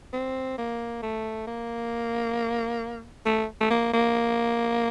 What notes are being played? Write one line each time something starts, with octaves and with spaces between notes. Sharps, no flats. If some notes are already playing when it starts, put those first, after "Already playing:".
C4
A#3
A3
A#3
A3
A3
A#3
A#3